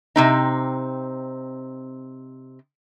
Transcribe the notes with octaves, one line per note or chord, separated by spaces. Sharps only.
C3 C4 D#4